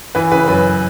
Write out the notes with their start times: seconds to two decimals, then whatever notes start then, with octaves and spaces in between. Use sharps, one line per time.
0.15 E3 B4
0.31 C#3 B4
0.48 F#2 B4